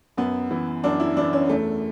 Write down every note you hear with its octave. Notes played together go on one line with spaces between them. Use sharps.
F#2 B3
E3
F#2 D4
E4
E3 D4
C#4
E2 A3